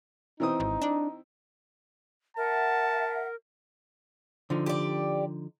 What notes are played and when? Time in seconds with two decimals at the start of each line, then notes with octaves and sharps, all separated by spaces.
0.40 E3 C4 D#4 D#6
0.60 G#1
0.82 D4
2.37 A#4 E5 F#5 A5
4.50 D3 F3 D#4
4.66 G4 D5